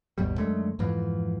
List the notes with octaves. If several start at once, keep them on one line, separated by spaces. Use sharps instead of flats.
G#1 D#2 B2 G3
F#2 D3 G#3 A3
F2 G#2 E3 F3